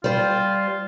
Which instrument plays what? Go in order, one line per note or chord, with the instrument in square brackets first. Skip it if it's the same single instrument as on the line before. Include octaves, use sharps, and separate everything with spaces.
[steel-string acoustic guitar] G3 C5 [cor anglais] F4